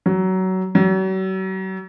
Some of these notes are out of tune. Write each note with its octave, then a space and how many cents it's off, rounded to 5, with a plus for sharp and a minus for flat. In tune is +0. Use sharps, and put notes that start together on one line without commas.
F#3 +20
F#3 +40